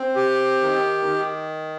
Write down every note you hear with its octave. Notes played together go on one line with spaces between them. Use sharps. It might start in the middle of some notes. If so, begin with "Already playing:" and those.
Already playing: C4
G4
D#3
D#3